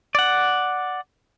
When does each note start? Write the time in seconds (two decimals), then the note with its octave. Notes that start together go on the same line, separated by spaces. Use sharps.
0.15 D5 F#5